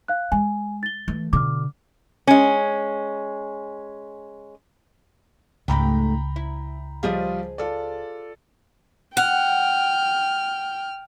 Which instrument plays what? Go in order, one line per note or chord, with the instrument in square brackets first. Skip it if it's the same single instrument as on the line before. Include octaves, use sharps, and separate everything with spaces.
[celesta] F5 F#6
[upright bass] G#3 [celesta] G#5
[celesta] A6 G7
[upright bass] E3 A3
[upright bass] B2 D3 [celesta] D6 F6
[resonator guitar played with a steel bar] G#3 C#4
[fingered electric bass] C#2 [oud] G#2 A3 G4 [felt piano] G5 A#5 B5
[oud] E4
[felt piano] F3 G3 F4 [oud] G#4 C5 D#5
[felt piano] F4 A4 D5
[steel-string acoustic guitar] F#5 [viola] G5 [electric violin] F6